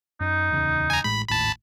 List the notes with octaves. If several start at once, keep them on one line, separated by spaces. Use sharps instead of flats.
F#2 D#4
D1 E2 C#3
G#5 A#5
A1 A2 G#3 B5
G#1 D#2 A2 A5 B5